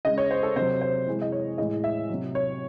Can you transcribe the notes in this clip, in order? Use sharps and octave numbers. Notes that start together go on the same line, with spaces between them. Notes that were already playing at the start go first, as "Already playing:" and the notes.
C#3 G#3 D#5
C#5
C5
A4
C3 F#3 C5
C5
C3 E3 G#3
D#5
C#5
A2 E3 G#3 D#5
E5
C3 F#3
C#5